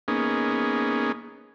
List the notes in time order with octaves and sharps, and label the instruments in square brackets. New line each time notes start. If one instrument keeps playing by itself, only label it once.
[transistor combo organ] A#3 B3 C#4 D#4 G#4